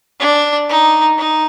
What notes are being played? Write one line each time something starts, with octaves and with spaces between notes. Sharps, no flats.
D4
D#4
D#4